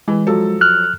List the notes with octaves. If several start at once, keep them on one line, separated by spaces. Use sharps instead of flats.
E3 G#3
F3 F#3 A4
F6 F#6